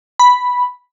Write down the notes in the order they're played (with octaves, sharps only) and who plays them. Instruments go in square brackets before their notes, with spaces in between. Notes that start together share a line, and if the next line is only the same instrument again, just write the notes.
[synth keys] B5